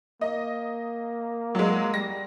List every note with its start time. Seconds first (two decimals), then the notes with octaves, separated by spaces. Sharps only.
0.21 A#3 D#5
1.55 F#3 G#3
1.94 G3 A#6